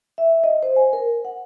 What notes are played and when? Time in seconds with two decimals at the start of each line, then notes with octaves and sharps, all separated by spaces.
0.18 E5
0.44 D#5
0.63 C5
0.76 G#5
0.93 A#4
1.25 F#5